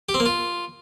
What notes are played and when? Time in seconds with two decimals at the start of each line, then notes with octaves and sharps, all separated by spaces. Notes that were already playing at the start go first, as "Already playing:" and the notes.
0.09 G4
0.14 C4
0.20 A#3
0.26 F4